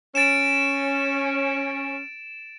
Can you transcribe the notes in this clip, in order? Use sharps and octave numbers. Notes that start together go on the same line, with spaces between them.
C#4 A6 D7 E7